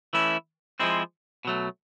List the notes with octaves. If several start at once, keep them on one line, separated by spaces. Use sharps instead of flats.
E3 A3 C#4 E4
F3 G#3 C4 E4
B2 F#3 A3